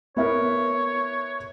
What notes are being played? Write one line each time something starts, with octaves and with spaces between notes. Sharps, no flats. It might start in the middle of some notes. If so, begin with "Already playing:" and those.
B3 E4 A#4 C#5